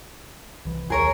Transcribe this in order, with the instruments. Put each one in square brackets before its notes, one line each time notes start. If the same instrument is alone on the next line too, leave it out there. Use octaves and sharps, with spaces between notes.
[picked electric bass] C2 E3
[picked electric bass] D#2 [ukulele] G#4 A#4 C#5